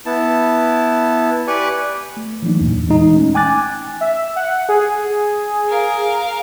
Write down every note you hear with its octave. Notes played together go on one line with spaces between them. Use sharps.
B3 E4 A5
G4 B4 D5 G#5 C#6
A3
E3 F#3 A3 A#3 D4 D#4
E2 A#2
E3 G#3 D#4
A3 C#4
G5 G#5 D6 F#6 A6
E5
F#5
G#4
A#4 F5